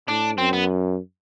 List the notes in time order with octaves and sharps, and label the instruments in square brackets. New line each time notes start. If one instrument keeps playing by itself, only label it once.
[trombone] A2 [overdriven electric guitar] D4
[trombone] F#2 [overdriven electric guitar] C4
[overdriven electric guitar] B3